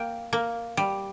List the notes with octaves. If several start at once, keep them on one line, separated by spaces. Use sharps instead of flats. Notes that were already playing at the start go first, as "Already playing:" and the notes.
Already playing: A#3 G5
A#3
G3